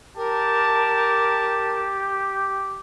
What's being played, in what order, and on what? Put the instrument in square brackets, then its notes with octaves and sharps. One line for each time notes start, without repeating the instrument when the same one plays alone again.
[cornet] G4 [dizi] A#4 [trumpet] A5